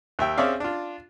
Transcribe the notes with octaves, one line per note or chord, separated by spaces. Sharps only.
D#2 E5 G5
C4 C#4 G#4 D5 E5 F5
D4 F4